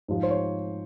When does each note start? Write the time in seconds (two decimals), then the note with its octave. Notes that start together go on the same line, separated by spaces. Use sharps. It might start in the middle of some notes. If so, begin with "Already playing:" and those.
0.08 G#2 F3
0.23 C5
0.30 C#5